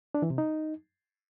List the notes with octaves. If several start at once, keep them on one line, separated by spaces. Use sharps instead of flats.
D4
E3
C3
D#4